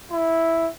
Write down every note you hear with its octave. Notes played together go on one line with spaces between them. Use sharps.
E4